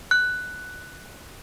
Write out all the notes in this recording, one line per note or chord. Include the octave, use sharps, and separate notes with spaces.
F#6